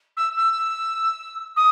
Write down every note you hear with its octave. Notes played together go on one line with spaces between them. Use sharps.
E6
E6
D#6